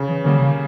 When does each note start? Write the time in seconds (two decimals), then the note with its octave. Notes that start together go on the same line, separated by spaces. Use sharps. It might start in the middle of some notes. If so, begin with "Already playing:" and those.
Already playing: C#3
0.09 E3
0.24 D3 G3 A#3 C#4
0.40 C#3